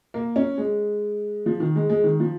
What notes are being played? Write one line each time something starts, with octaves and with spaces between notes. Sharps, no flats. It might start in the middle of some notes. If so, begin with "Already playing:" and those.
A#3
C#4
G#3
F3
D#3
G#3
G#3
D#3
F3